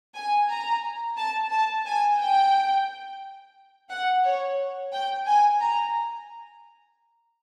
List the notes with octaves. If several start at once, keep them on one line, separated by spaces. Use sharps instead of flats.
G#5
A#5
A5
A5
G#5
G5
F#5
C#5
G5
G#5
A#5